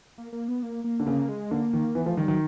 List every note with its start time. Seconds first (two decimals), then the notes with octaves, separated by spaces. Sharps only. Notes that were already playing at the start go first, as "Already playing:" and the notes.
0.18 A#3
0.33 A#3
0.48 B3
0.63 A#3
0.84 A#3
1.00 D3
1.07 C#3 A#3
1.29 G#3
1.51 D3 A#3
1.73 D#3
1.95 E3 B3
2.06 F3 A3
2.17 D#3 G3
2.28 D#3 F#3